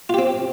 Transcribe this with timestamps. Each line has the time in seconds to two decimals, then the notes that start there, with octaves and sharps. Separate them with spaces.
0.09 F4
0.14 G4
0.18 C4